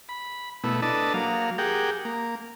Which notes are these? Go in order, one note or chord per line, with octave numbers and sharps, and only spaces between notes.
B5
B2 A3 B3 E4
D4 A4 B4 D#5 A5
F#3 A#3 F5
G4 G#4 A#4 F#5 G5
A#3